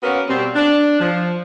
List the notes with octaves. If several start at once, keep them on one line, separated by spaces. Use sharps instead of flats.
A#3 B3 C#4 F#4 A#4
B2 G3 C4
D4
F3